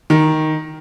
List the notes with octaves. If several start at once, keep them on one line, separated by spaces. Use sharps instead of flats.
D#3